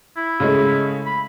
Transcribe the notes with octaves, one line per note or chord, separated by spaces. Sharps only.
E4
C#3 G#3 A3
B5